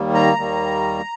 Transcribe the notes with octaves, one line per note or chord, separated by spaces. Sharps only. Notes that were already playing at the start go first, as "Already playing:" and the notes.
Already playing: D#2 D#3 G3 A#3
A#5
D#2 D#3 G3 A#3